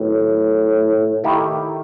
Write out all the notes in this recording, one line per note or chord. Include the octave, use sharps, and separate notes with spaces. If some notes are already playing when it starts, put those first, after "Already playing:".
Already playing: A2 D#3 F#3 B3 F#4
D#3 A3 E4 G4